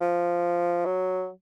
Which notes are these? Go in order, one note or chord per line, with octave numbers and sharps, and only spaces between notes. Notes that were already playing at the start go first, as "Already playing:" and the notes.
F3
F#3